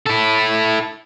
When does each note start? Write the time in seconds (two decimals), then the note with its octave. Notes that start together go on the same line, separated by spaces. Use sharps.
0.06 E4 A4